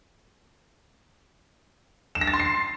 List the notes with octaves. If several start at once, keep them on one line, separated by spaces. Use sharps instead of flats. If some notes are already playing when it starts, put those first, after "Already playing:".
E7
A#6
A6
C6
C7